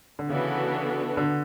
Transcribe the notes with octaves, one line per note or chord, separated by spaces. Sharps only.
D3
C#3 E3 B3 D4 F#4 A4
D3